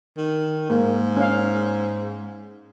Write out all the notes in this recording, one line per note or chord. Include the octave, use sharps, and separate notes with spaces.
D#3
G#2 A#3
C#4 F5